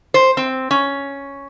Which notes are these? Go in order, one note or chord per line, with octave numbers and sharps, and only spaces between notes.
C5
C4
C#4